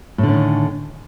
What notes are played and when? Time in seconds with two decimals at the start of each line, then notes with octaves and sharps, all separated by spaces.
0.18 A2
0.23 D3
0.28 C#4
0.33 D#3